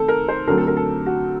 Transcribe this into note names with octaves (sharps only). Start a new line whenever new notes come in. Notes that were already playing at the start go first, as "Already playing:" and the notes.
Already playing: D#3 A3 C4 A4
A#4
C5
D3 F#3 A3 C4 A#4
A4
A#4
A4
F#4